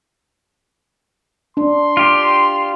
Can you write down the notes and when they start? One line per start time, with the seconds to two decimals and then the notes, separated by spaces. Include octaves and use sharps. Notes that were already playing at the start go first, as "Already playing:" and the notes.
1.57 D4 C6
1.97 F4 G4